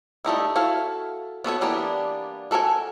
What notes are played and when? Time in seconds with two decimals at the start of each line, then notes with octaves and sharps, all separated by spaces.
0.25 G3 A3 D#4 E4
0.56 E4 F#4 A4 F5
1.44 B3 F#4 A4 C#5
1.61 E3 G3 A#3 B3 D4
2.51 F#4 A4 A#4 C#5 G#5